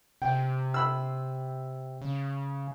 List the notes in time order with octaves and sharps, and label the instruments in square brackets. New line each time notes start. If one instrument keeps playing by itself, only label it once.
[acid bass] C3 [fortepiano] G5
[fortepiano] B5 E6
[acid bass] C#3